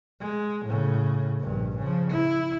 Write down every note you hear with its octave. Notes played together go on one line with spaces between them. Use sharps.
G#3
A2 C#3
A#1 G2
C#3 F3
E4